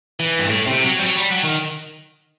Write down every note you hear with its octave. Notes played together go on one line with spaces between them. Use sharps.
E3
G2
A2
C3
F#3
G3
F#3
G3
F#3
D#3